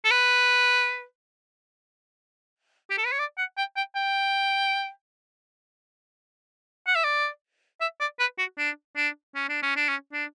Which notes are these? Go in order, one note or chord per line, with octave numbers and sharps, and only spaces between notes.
A4
B4
G4
A4
B4
C#5
D5
F#5
G5
G5
G5
F#5
E5
D5
E5
D5
B4
F#4
D4
D4
C#4
D4
C#4
D4
C#4
D4